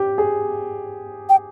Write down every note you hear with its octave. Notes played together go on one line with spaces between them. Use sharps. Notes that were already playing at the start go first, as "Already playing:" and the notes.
Already playing: G4
G#4
G5